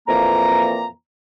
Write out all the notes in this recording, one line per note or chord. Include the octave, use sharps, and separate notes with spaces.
F2 A#2 E3 A#3 A#5